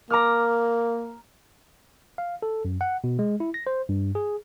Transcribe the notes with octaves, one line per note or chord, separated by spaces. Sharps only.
A#3 A#5 D6 F6
F5
A4
F#2
F#5
B2
G#3
E4
A#6
C5
G2
G#4